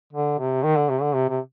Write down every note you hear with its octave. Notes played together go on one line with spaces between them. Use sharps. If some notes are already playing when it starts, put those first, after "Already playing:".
D3
C3
D#3
D3
C3
D3
C3
C3